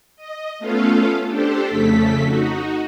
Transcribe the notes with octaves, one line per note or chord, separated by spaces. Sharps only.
D#5
A3 B3 C#4 F4 A4 F5
D4 G4 A4 C5
F2 C#3 A3 A4 B6
D#4 F#4